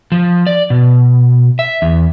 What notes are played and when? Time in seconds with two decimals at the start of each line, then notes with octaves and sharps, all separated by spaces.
0.12 F3
0.47 D5
0.70 B2
1.59 E5
1.82 E2